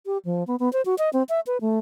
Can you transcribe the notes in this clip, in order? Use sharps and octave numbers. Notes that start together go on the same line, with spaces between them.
G4
F3
B3
B3
C5
F#4
D#5
C4
E5
B4
A3